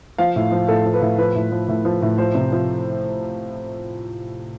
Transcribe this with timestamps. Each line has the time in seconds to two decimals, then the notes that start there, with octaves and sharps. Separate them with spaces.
0.18 F3 F5
0.36 A2
0.52 F3
0.68 A2 A4
0.86 F3
0.94 B4
1.02 A2
1.18 F3 B4
1.35 A2
1.52 F3
1.68 A2
1.85 F3
2.02 A2
2.18 F3 C5
2.35 C3
2.52 F3